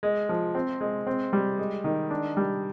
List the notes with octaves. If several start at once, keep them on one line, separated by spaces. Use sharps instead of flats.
G#3
F3
C4
G#3
C4
G3
G#3
D#3
D4
G3